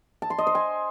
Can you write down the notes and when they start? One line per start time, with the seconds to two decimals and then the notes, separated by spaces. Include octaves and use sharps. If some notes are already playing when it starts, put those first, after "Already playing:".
0.22 A5
0.30 C6
0.38 D#5
0.47 C5
0.55 G#5